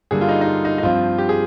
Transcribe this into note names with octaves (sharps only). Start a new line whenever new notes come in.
G2 D3 G3 A#3 G#4
F4
D#4
D#4
F4
D#4
D#4
G2 F3 C4 F4
G4
G#4